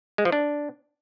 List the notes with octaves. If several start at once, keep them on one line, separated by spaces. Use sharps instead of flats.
G#3
F3
D4